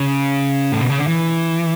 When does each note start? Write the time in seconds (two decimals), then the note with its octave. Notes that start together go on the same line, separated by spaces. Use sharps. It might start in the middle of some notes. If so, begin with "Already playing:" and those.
Already playing: C#3
0.72 A2
0.81 B2
0.90 C#3
0.99 D3
1.07 E3